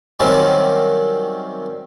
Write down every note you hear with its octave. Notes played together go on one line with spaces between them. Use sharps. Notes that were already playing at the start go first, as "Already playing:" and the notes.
C3 D#3 F#3 G3 C4 C#4